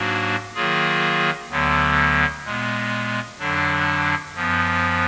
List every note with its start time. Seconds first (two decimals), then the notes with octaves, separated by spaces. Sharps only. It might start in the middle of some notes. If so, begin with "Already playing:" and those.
Already playing: G#2 F#3 A#3 D4 F#4
0.54 D#3 F#3 A#3 F4 G#4
1.49 D2 D3 F#3 B3
2.45 A#2 G#3 B3
3.39 F2 D3 F#3 D4
4.34 F#2 F3 B3